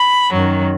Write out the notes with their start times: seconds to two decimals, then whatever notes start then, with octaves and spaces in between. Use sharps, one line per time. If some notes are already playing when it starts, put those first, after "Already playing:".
Already playing: B5
0.31 F#2 D#3 F#3